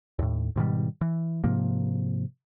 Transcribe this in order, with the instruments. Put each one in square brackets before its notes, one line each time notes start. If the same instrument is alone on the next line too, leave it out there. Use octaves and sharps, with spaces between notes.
[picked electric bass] D#2 A2
G#2 B2 D#3 G3
E3
G#2 C3 F3 A#3